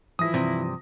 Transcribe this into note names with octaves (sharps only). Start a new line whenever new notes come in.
E3 F3 E4 D#6 A#6
G2 C3